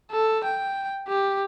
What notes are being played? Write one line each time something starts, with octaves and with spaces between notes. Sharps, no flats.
A4
G5
G4